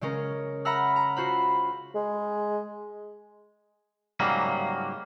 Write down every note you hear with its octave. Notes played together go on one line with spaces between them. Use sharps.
C#3 G#3 C#4 A#4
E5 F#5 A#5 B5 E6 F6
A#5
F4 F#4 C5 B5
G#3
G#2 C#3 F#3 G3 A#3